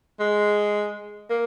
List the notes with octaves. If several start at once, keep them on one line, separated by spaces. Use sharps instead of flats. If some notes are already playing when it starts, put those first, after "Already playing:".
G#3
A#3